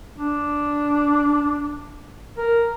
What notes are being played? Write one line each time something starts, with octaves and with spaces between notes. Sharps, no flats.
D4
A#4